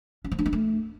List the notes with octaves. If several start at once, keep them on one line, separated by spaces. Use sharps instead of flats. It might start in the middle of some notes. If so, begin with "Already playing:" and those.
C#4
F3
D4
B3
A3